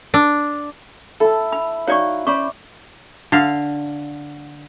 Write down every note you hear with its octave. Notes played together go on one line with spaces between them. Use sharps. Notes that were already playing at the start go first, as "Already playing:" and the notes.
D4
E4 A4 A5
B5
D#4 F#4 C#5 D5 F5 C#6
C#4 C5 D5 B5 C#6
D3 F5